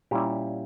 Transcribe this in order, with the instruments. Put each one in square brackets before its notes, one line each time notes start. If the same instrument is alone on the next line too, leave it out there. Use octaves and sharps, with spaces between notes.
[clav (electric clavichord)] A#2 G3 C#4 E4 G4